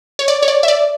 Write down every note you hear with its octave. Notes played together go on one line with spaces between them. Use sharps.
C#5
D5
C#5
D5
E5
D5